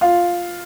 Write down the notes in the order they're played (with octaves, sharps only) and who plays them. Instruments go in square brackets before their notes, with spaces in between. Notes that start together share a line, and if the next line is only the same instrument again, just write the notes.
[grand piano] F4 F5